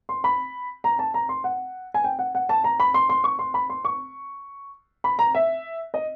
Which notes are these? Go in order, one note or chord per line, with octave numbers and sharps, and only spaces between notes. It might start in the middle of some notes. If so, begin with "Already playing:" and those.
C6
B5
A#5
A5
A#5
C6
F#5
G#5
G5
F#5
F#5
A5
A#5
B5
C6
C6
C#6
C6
B5
C6
C#6
B5
A#5
E5
D#5